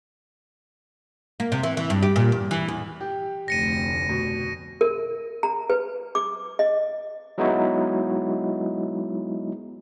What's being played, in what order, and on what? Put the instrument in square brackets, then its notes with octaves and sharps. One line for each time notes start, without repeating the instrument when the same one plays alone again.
[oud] A#3
C3
E3
E3
G2
G4
A#2
E2
E3
E2
[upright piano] G4
[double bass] F1 D2 [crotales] A#6 C#7 D#7
[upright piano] B2
[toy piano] A#4
A#5
B4
D6
D#5
[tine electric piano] F#3 G#3 B3 D#4 E4 F#4